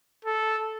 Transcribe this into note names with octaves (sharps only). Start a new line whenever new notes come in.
A4